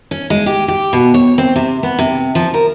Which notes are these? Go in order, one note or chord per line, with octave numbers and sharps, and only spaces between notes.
C#4
G#3
G4
G4
B2
C#5
C4
C3
B3
C3
F3
A#4